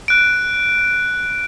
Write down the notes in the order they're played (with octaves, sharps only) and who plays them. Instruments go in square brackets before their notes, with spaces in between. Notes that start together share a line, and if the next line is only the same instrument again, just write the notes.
[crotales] F#6 D7